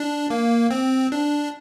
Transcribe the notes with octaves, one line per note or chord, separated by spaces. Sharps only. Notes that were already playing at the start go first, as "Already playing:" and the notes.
Already playing: D4
A#3
C4
D4